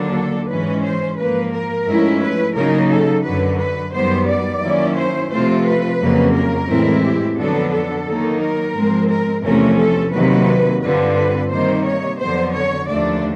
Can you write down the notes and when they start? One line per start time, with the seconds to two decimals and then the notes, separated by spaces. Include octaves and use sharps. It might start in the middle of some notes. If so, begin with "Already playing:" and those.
Already playing: D#2 D3 F#3 A#3 D4
0.15 A4
0.49 G#2 E3 G#3 C#4 B4
0.84 C5
1.18 G#2 F3 A#3 B4
1.53 A#4
1.87 G#2 F3 A3 C#4 E4
2.21 B4
2.56 C#3 F#3 A#3 D#4 A#4
2.90 A4
3.24 F#2 D3 F#3 B4
3.59 B4
3.94 F#2 D#3 G3 B3 C5
4.29 D5
4.63 D#3 F#3 A#3 C#4 E4
4.97 C5
5.31 C3 F3 A3 C4 F4 C5
5.66 B4
6.00 F2 C#3 F#3 A#3
6.35 A#4
6.69 A2 E3 G#3 C4 E4
7.03 G4
7.38 F2 D3 F#3 B3 D4 A4
7.72 A4
8.07 D#3 F#3 A#3 D#4
8.41 A#4
8.76 G#2 F3 G#3 C4
9.10 A#4
9.44 E2 C3 F3 A3 C#4 A#4
9.79 A4
10.13 C3 D#3 F#3 A#3 B4
10.82 G2 D3 G3 C4 F4 B4
11.16 B4
11.51 C3 D#3 G3 A#3 D#4 C5
11.85 C#5
12.20 F2 D3 F#3 B3 C5
12.54 C#5
12.88 D#2 D3 F3 A3 D4 D5